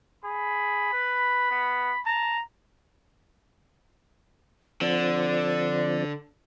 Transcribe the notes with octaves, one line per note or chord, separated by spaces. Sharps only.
G#4 B5
B4
B3
A5 A#5
D3 F3 C4 D5